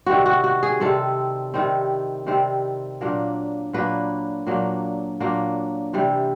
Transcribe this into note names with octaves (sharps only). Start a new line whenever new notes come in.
C3 D#3 G3 C4 F#4
F#4
F#4
G#4
C3 D#3 G3 C4 A4
C3 D#3 G3 C4
C3 D#3 G3 C4
A#2 F#3 A#3 D4
A#2 F#3 A#3 D4 B4
A#2 F#3 A#3 D4
A#2 F#3 A#3 D4
C3 E3 G3